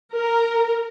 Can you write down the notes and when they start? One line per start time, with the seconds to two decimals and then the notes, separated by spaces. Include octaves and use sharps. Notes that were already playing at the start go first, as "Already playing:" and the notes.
0.14 A#4